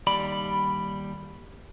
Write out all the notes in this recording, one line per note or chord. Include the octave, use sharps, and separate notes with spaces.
D#2 G3 D5 B5